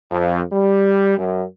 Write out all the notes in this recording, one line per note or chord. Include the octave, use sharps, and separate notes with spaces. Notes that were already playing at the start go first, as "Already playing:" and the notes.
F2
G3
F#2